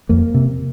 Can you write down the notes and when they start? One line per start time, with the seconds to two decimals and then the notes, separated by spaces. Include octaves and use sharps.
0.09 F2 A#3
0.34 C3